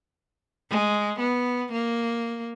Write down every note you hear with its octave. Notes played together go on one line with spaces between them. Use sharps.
G#3
B3
A#3